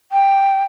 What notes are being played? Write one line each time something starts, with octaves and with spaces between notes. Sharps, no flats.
G5